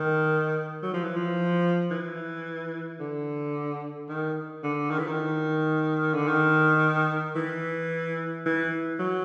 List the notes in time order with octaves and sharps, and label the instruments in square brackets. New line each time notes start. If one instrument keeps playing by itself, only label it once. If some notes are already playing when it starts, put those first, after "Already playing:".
Already playing: [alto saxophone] D#3
F#3
F3
E3
F3
E3
D3
D#3
D3
D#3
E3
D#3
D3
D#3
E3
E3
F#3